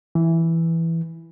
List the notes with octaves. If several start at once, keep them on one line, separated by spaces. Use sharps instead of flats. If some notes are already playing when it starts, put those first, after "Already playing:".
E3